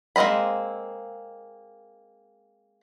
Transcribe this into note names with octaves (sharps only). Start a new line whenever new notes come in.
G#3 A#3 C4 D#5 B5